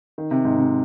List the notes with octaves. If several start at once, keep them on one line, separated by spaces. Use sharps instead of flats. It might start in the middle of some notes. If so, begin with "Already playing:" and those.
D#3
C3
G#2
C3